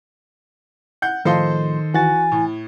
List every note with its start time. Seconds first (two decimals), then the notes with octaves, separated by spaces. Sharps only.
1.02 F#5 G6
1.25 A2 D#3 F3 A4 C5 D#5 F5 C6
1.94 E3 F#4 G#5 A6
2.32 A2